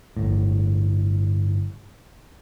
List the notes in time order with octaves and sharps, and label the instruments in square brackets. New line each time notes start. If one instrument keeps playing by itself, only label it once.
[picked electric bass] G1 A2